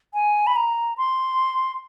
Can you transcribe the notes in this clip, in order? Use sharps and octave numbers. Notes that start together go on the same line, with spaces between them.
G#5
B5
A#5
C6